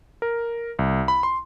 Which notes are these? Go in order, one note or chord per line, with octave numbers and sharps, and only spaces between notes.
A#4
C2
B5
C6